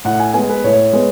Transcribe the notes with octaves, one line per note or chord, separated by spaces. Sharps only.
A2 F#5
G#5
G#3 B3 G#5
B4
A2 C#5
G#3 B3